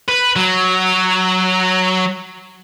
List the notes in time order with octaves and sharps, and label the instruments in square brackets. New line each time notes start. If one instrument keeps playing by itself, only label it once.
[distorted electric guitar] B4
F#3